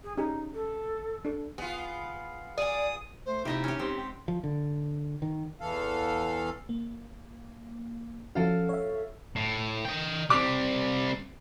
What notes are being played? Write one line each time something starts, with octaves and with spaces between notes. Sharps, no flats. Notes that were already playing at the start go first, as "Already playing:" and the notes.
G#4
C#4 D#4 G4 G#4
A4
D4 A4
B3 F4 G#4
G#4 D5 G#5 D#6
A3 C5
C3 F3 A#3 D#4 E4 G4 D#5 E5
C#4 G4
G#2 C4 G4 C6
G5
F3
D3
D#3
E2 E3 A4 F5
A#3
F3 C#4 F#4 A4 F5
C#5 E5
A2
D#5 G5
G3 C4 D6